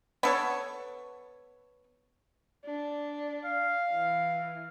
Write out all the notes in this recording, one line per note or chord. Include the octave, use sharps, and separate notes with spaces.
B3 A4 C#5
D4
F5
E3